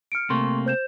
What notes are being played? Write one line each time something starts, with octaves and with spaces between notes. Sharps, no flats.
F6 C#7 D7
C3 A3 A#3 C6 C#6
C5 G6 E7